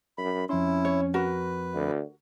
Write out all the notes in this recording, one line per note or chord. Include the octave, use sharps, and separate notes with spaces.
F#2 B5
F2 C#4 E4 C6
C#5
F#4 A#4 B4
D2